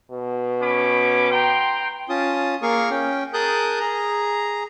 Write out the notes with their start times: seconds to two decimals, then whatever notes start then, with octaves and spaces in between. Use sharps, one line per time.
0.11 B2
0.62 C#4 B5 D6
1.31 G5 A#5 C6
2.09 C#4 F4 A5 D#6
2.62 A#3 G#4 A#4 F5 C#6
2.91 C#4 G5
3.34 G#4 A#4 A5 D#6 F#6 G6
3.79 G#4 A#5